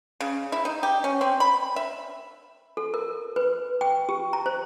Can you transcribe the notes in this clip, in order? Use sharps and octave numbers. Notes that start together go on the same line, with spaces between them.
C#3
E4
D#4
G4
C#4
C4
B5
E5
A4
A#4
B4
G5
G4
A#5
C5